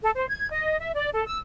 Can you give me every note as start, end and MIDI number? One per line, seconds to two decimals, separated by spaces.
0.02 0.11 69
0.16 0.26 72
0.29 0.48 92
0.51 0.76 75
0.80 0.91 76
0.94 1.10 74
1.13 1.24 69
1.26 1.38 88